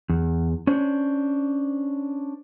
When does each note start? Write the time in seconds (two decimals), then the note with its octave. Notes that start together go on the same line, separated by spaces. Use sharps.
0.10 E2
0.67 C#4 D4 C5